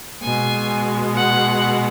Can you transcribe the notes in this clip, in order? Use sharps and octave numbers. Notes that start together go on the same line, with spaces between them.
B2 G#3 G#5
F#5